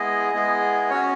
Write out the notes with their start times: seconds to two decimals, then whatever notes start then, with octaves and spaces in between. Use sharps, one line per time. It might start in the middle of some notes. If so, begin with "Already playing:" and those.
Already playing: G#3 B3 E4 G#4 D#5
0.34 G#3 B3 E4 G#4
0.90 C#4 F#4 C#5